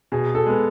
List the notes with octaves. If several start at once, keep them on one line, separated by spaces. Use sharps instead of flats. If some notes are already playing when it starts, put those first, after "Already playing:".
B2 G#4
A4
G#3 B3